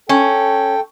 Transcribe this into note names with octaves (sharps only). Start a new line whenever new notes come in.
C#4 A4 G5